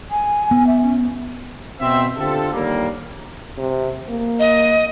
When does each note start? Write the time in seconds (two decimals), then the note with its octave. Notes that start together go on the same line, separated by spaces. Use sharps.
0.11 G#5
0.51 B3
0.67 E5
0.82 C#4
1.80 B2 C4 E5
2.17 D3 C4 F4 G4 A4
2.53 D#2 D3 G3 A#3
3.58 C3
4.09 A#3
4.39 D#5